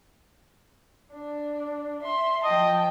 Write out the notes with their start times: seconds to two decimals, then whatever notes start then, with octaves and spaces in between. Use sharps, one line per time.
1.13 D4
2.01 E5 C6
2.44 F3 D#5 G5 A5